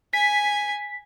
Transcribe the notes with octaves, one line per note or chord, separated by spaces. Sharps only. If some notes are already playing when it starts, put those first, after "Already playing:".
G#5 B6